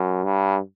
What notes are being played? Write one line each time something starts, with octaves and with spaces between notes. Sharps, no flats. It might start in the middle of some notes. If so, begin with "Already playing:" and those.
Already playing: F#2
G2